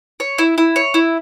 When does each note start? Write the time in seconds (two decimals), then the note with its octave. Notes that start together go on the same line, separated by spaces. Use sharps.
0.20 C#5
0.38 E4
0.58 E4
0.76 C#5
0.94 E4